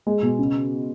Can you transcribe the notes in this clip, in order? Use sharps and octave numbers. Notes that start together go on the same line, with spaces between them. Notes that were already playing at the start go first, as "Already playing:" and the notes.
G#3
B2
C#3